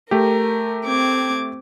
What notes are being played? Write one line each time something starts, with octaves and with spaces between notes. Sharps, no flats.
A3 G4 A#4
C4 D6 G#6